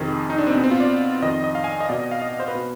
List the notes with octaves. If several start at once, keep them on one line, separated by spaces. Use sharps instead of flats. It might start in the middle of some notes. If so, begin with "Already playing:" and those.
Already playing: F2 C3 D#3 G#4
D#4
D4
C4
B2 B3
C4
F4
D5
F2 D#3 D#5
D#5
F5
G#5
D#5
B2 D5
D#5
F5
D#5
C5
B4
B2